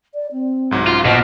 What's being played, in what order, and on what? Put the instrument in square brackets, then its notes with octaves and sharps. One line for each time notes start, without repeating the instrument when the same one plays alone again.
[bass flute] D5
C4
[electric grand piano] C2 G#2 F#3
[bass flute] C#4 [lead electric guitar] F4
[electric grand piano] A#1 F3 F6 [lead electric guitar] B2 [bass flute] D#5